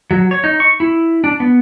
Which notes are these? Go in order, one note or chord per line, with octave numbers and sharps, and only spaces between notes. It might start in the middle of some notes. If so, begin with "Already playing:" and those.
F#3
C#5
D#4
C#6
E4
D4
B3